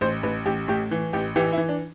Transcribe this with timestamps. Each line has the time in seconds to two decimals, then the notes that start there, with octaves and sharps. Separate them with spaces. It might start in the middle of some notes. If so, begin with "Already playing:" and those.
0.01 A1 C5
0.23 A1 B4
0.46 A1 G4
0.68 A2 G4
0.91 E3
1.13 A1 G4
1.36 E3 G4
1.52 E4
1.58 E3
1.69 D4